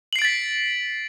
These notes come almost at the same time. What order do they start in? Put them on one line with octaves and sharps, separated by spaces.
F#7 C7 D7 A6 B6